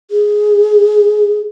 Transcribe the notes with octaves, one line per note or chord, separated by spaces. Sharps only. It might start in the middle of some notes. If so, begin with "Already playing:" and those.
G#4